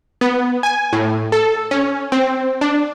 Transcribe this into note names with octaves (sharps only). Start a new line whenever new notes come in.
B3
G#5
A2
A4
C#4
C4
D4